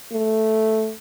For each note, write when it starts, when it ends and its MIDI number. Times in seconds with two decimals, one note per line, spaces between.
0.13 0.93 57